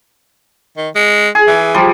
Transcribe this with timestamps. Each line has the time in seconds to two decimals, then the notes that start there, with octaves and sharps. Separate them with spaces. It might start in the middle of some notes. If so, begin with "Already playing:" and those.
0.77 D#3
0.95 G#3
1.35 G#4
1.47 E3
1.74 F3 G3